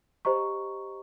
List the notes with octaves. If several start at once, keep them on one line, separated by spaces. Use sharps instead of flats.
G4 C5 D#5 A#5 C#6